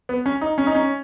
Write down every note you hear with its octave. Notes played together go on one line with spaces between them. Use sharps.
B3
C#4
D#4
C#4
D#4
C#4